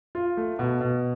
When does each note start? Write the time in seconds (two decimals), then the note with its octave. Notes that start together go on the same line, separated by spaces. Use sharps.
0.15 F4
0.37 A3
0.59 B2
0.81 B2